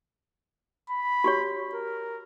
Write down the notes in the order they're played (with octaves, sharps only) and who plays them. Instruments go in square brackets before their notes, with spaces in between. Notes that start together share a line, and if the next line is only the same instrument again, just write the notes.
[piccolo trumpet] B5
[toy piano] F#4 G4 C#5
[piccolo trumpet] A#4